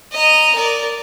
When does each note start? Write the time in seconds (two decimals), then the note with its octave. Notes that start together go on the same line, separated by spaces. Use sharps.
0.12 D#5 A#5
0.56 A#4 D5